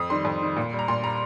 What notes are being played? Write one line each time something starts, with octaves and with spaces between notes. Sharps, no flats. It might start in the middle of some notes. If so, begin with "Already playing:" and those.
Already playing: F2 D#6
D#3 G3 C6
F2
D#3 G3
A#2
G3
A#5
A#2 C6
G3 A#5